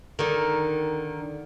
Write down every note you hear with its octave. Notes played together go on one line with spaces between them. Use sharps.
D3 D#3